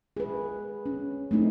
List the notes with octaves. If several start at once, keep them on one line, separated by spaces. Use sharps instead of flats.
G#4 B4
C#4
A3 C4 D#4 E4